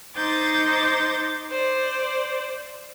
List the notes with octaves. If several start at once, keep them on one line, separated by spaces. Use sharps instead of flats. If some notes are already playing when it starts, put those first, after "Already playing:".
D#4 C5 D6 G6 A6
C5 D5